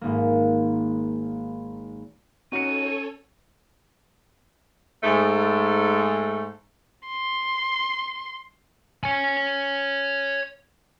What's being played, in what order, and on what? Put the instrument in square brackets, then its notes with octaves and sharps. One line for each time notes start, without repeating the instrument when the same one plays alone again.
[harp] G#1 A#3
[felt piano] C#4 C#7 [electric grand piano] D#4 F#4 [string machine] A4 C#5 [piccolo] D#7
[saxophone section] G#2 A3
[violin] C6
[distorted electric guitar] C#5 G#5